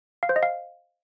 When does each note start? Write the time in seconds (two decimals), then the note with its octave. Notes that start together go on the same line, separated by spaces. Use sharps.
0.23 F5
0.29 C5
0.36 D#5
0.43 F5